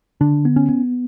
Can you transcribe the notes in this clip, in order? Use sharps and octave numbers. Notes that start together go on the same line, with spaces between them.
D3 D4
B3
C#4
B3